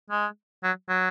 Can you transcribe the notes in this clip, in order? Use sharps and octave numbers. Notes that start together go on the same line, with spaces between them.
G#3
F#3
F#3